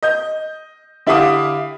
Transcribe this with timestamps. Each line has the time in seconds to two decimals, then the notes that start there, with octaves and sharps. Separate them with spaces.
0.03 D#5 G6
1.07 D3 E4 G4 F5 D6 D#6